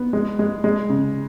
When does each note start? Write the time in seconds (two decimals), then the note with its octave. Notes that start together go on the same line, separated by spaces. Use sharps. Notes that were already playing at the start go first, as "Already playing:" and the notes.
Already playing: B3
0.13 G#3
0.39 G#3
0.64 G#3
0.89 C#3